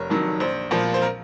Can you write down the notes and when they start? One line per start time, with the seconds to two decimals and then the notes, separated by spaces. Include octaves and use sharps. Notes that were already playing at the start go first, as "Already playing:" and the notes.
Already playing: F1 A#4 C#5
0.10 F2 D#3 F#3
0.40 A#1 C5
0.71 A#2 F3 C5
0.94 C5
1.02 A#4